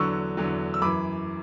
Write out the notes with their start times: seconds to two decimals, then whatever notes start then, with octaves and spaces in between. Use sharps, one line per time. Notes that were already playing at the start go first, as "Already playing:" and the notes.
Already playing: E2 D3 F#3 C#6 E6
0.37 E2 D3 F#3
0.74 E6
0.82 F#2 E3 B5 D6